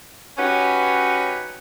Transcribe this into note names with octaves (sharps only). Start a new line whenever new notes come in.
C#4 D#4 F#4 G4 B4 C#5